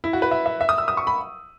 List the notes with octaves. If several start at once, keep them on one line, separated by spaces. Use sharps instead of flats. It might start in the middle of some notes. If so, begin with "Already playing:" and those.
E4
F#4
B4
E5
E5
E5
D#6
E6
D#6
C#6
B5